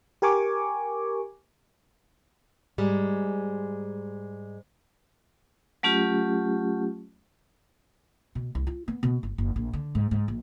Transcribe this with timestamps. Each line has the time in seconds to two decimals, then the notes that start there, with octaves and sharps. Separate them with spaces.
0.22 G4 A#4 G#5 C#6 D6
2.78 G#2 G3 G#3
5.83 F#3 A3 C#4 F4 G4
8.35 B2
8.55 C2
8.67 F4
8.88 B3
9.03 B2
9.23 G1
9.38 F#1
9.56 A#1
9.73 D3
9.95 G#2
10.11 G#2
10.28 A#1